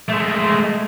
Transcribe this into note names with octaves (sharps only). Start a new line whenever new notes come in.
G#3 A3